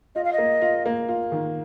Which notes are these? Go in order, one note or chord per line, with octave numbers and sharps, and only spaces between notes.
F4 D#5
F5
D#5
A#3
F4
A#3
F4
D#3